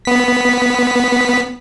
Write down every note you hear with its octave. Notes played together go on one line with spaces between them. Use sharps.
B3 B6